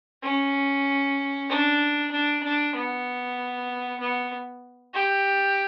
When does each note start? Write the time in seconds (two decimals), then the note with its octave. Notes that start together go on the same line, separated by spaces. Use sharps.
0.23 C#4
1.50 D4
2.11 D4
2.43 D4
2.75 B3
4.00 B3
4.94 G4